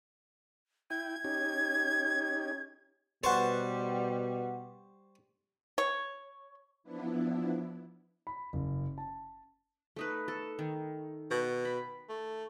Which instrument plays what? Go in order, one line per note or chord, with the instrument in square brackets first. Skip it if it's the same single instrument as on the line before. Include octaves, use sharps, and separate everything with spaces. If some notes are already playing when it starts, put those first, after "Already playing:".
[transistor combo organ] E4 G5 [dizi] G#6
[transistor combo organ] C#4 D#4 G4
[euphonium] B2 [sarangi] G3 [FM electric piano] B4 F#5 [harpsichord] C5 A5 C#6
[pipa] C#5
[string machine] F3 B3 D4 E4
[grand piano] B5
F#1
A5
[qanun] A3 D#4 B4
A4
D#3
[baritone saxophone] B2 [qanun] F#5
[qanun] B5
[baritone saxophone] A3